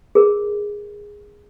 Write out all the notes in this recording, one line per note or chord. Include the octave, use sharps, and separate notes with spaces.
G#4 A#4